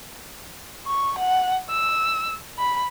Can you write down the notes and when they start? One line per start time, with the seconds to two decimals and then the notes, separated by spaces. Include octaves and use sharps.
0.86 C#6
1.19 F#5
1.70 E6
2.59 B5